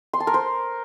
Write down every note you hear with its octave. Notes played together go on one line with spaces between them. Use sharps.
C6
A5
A#4
C5